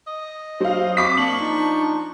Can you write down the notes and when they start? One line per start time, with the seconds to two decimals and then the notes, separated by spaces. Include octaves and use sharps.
0.07 D#5
0.60 F#3 C5 F5
0.97 C4 C#6 D6 B6
1.18 A#3 D4 C#6 F#7
1.40 F3 D#4